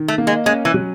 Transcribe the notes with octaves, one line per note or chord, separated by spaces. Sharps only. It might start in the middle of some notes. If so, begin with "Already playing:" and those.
Already playing: D#3
A3
A#3
G#3
G#3 C#4
E3
F#3